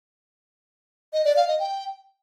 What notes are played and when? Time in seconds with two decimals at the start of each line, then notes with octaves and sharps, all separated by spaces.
1.13 D#5
1.25 D5
1.36 F5
1.48 D#5
1.60 G5